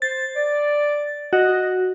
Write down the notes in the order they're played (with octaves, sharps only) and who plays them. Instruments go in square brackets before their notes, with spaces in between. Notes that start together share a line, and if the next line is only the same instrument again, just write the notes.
[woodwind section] C5 [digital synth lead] A6
[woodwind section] D5
[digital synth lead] F#4 [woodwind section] D#5